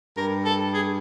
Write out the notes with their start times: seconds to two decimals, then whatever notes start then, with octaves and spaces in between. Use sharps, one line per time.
0.17 G2 A#4
0.45 A4
0.74 G#4